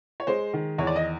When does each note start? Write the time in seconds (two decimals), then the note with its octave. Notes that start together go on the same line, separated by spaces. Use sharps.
0.20 C#5
0.27 G#3 C5
0.53 D#3
0.78 E2 C#5
0.87 D5
0.96 D#5